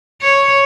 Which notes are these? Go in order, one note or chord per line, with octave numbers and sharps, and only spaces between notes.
C#5